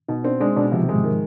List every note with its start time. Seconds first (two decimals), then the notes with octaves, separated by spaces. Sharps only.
0.09 B2 D#4
0.24 C4 D4
0.40 G#3 D4
0.56 B2 D4
0.72 C3 F3
0.83 D#3
0.89 G#3
0.94 G#2
1.04 D#3